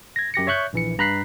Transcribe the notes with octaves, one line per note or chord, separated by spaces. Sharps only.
G#6 A#6
F#2 G4 A#6 C#7
C#5 E5 C#6 F#6 G6
A#1 E3 C#7
G2 A#5 B5 F#6 B6 C7